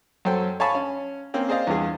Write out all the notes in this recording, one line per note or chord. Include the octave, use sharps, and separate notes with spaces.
F#2 F#3 A4 C5 G5
C#5 F5 G#5 A5 B5 C#6
C#4
A#3 C4 C#4
G#4 C5 D5 D#5 F5
E2 G2 F4 G#4